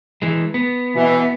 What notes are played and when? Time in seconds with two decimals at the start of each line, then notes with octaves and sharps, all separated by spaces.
0.22 E3 G#3
0.54 B3
0.96 B2 E3